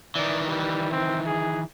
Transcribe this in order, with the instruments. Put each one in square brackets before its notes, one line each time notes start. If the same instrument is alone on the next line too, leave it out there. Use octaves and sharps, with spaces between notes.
[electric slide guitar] D#3 E3 [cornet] D5
[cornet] G3
C4
G#4